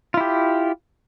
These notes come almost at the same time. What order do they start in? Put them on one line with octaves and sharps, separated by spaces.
F4 E4 G4